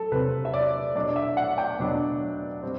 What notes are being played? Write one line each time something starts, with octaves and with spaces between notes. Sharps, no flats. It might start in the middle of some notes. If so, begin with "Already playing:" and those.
Already playing: F#3 A4
C3 F#3 C4 B4
E5
D5
B2 F#3 B3 D4 D5
E5
F#5
G5
B2 F#3 B3 D4
G3 C4